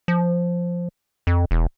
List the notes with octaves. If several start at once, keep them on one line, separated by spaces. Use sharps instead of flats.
F3
F2
E1